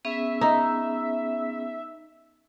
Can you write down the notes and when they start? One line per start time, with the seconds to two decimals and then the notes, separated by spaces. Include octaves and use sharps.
0.05 B3 C#4 G#4 E5
0.41 D#4